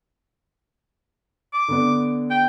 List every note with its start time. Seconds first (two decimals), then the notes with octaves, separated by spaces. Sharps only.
1.53 D6
1.68 D3 B3 D4
2.30 G5